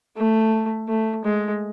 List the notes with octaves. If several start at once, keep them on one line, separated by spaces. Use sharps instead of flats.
A3
A3
G#3